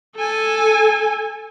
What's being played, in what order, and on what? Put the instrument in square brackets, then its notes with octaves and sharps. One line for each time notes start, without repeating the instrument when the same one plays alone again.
[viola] A4 G#5